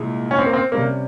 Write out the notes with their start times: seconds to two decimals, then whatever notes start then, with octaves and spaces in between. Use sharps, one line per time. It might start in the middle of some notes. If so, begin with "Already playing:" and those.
Already playing: C2 A#2 G#3
0.31 C#4
0.39 C4
0.46 A#3
0.53 C4
0.72 C3 G3 A#3 C#4